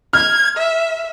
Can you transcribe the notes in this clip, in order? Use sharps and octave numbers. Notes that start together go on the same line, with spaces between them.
F6 G#6
E5